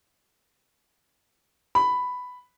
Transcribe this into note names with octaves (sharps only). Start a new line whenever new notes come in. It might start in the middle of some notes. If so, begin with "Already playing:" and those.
B5